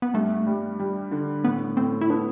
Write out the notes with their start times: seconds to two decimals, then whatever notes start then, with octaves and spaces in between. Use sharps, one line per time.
0.02 B3
0.14 G2 A3
0.47 G3
0.80 G3
1.11 D3
1.44 A2 B3
1.77 A2 C4
2.01 E4
2.10 B3 D4